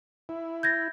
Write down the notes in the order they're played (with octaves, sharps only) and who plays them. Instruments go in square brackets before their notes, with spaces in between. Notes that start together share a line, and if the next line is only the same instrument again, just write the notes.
[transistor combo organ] E4
[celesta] G6 G#6 A#6